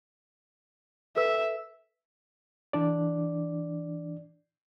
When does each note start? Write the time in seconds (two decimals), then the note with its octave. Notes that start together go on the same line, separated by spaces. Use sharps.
1.17 A4 B4 E5 E6
2.73 E3 D4 D5